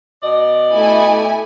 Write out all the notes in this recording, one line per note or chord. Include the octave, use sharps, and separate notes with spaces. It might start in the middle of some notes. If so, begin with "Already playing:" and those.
B2 D5 D#5
A3 E4 G#5